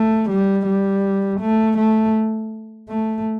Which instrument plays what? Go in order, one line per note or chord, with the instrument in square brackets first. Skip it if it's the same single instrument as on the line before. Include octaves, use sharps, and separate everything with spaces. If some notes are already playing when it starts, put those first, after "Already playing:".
Already playing: [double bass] A3
G3
G3
A3
A3
A3